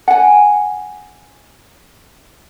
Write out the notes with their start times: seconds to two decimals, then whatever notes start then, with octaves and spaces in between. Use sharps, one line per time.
0.08 F#5 G#5